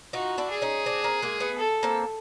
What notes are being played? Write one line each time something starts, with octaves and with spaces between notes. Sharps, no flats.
D#4 F4 F#4
D4 E4
G#4
C#4 D#4
C4 D4
A#3 C4
G#3 A#3
A3 B3
A4
A#3 C4